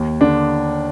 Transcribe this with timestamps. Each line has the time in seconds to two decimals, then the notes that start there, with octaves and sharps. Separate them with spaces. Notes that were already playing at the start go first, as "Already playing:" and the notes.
Already playing: D#2
0.21 D3 D4